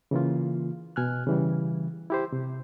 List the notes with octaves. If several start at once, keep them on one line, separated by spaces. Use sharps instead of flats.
C#3 E3 A#3 F4
B2 G#5 F6 F#6
C#3 E3 G3
E4 G4 C5
C3